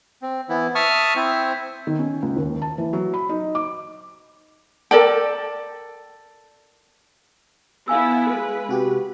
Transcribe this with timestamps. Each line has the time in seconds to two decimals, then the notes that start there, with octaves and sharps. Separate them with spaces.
0.22 C4
0.49 E3 B3 E4
0.75 E5 A5 C#6 D#6 F6
1.16 C4 E4 C5 E5
1.87 D#3
1.99 C#4
2.22 C#2
2.37 D#2
2.62 A5
2.78 E3
2.93 F#3
3.14 B5
3.29 D#4
3.55 D6
4.91 A4 A#4 D5 G5
7.88 B3 E4 F5 G#5 E6
8.29 G#3 B4
8.69 C3 F#4 G4